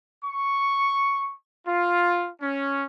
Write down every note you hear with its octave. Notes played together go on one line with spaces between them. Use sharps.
C#6
F4
C#4